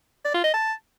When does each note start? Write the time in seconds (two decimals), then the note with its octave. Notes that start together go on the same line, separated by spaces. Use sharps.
0.25 D5
0.34 F4
0.44 D#5
0.54 A5